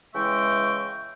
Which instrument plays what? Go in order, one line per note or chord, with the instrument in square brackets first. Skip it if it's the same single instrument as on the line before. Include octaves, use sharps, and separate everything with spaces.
[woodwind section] C#3 E3 G#3 E5 G5 C#6